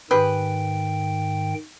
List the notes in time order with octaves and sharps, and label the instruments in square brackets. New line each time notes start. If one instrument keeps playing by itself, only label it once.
[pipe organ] G#2 D#3 G5 [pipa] G4 G#4 B4